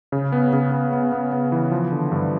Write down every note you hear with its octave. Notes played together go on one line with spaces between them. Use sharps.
C#3
B3
C#3
B3
B3
B3
B3
E3
F3
D3
G2